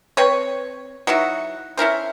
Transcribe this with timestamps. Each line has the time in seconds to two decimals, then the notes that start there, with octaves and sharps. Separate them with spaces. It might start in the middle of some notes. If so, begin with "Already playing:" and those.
0.17 C4 B4 C#5
1.07 F#3 D#4 E4 F#4
1.77 C#4 E4 A#4 C5